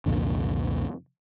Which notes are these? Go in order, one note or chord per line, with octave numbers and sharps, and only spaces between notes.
C2 F2 A#2 D3